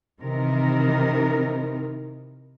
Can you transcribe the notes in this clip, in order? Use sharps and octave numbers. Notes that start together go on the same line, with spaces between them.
C3 D#3 E3 D#4 A#4